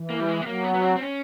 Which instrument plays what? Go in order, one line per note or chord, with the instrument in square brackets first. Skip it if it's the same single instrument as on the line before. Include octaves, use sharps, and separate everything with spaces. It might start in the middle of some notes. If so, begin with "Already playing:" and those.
Already playing: [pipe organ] E3
[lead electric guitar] A#3
G3
G#3
B3
[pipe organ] F#3 [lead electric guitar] A#3
[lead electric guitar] B3
B3
C4
C4
C#4